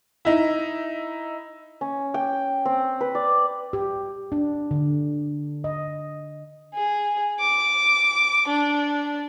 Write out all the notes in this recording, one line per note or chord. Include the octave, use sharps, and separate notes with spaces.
D#4 E4
C#4
G5
C4
B4
D5
G4
D4
D3
D#5
G#4
D6
D4